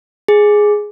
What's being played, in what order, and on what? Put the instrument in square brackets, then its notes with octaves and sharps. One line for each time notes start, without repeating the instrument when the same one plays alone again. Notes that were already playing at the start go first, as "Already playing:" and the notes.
[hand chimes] G#4